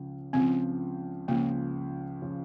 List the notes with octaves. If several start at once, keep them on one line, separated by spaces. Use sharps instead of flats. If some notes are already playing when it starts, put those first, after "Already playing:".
Already playing: C#2 C#3 F3
C#2 C#3 F3 C4
C#2 C#3 F3 A#3
C#3 F3